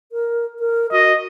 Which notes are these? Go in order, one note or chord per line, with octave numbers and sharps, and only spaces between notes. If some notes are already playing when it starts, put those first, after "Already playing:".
A#4
A#4
F#4 D#5